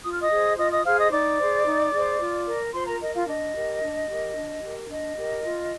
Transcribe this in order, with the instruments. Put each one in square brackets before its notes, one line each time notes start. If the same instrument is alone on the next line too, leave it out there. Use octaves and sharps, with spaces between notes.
[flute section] F4 D#6
F6
D#5 D#6
G#4 C5
F4 D#5 D#6
D#5 D#6
G#4 C5 F5 F6
D#5 D#6
D#4 D5 D6
C5
G#4
D#4
G#4 C5
F4
A#4
F4 C5 C6
A#4 A#5
A#4 D#5
F4 F5
D4 D#5
G4 A#4
D4
G4 A#4
D4
G4 A#4
D4 D#5
G4 A#4
F4